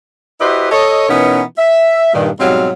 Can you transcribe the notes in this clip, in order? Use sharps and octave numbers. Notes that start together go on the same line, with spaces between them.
E4 F#4 G4 B4 C5 D#5
A4 C#5 D#5
B2 E3 B3 C#4 D#4 A#4
E5
G2 A#2 D#3
G#2 B2 F#3 G3 C4 F5